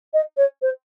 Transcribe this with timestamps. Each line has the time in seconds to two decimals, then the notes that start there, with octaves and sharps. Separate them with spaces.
0.13 D#5
0.37 C#5
0.62 C5